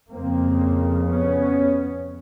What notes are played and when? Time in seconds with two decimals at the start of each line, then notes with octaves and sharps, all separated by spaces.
0.11 F2 C#3 A#3 C4
1.06 B3 C#4